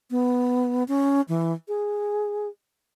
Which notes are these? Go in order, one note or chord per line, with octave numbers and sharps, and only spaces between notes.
B3
C#4
E3
G#4